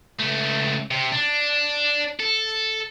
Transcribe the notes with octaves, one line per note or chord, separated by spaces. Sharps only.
C#2 A3
C3
D4
A4